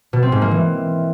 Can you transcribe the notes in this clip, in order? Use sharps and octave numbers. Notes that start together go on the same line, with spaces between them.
B2
C4
G#2
A#3
E3